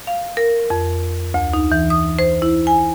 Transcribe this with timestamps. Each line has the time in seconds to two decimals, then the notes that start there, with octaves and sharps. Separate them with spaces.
0.07 F5
0.37 A#4
0.70 F2
1.34 D2
1.54 D#4
1.72 E3
1.90 D#6
2.19 C5
2.42 E4
2.67 G#5